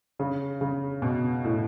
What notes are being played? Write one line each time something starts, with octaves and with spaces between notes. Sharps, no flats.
C#3
C#3
B2
A2